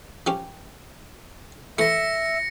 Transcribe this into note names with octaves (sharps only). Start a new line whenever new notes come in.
F3 C#4 G4
E3 A3 E5 A#6 C#7